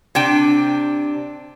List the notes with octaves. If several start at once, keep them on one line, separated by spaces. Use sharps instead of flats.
C3 D4 G5